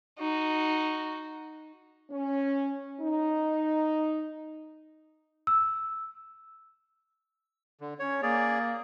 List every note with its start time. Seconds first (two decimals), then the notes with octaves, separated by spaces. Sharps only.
0.19 D#4 F#4
2.10 C#4
3.00 D#4
5.47 E6
7.81 D3
7.99 C#4 C#5
8.23 A#3 G#4 D5